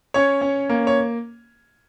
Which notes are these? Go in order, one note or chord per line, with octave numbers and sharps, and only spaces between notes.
C#4 C#5
C#4
A#3
C#5